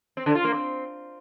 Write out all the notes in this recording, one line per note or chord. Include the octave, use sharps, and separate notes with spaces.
C4
D3
F4
A#3
C4